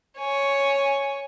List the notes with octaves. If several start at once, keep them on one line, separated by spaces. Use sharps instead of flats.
C#5 G#5